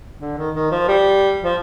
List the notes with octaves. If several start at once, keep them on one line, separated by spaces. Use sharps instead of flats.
D3
D#3
D#3
F3
G3
F3